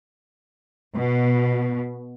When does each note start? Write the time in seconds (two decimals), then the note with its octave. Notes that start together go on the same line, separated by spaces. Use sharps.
0.93 B2